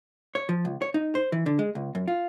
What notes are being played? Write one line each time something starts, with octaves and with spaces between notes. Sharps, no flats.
C#5
F3
C#2
C#5
D#4
C5
E3
D3
G#3
C#2
F#2
F4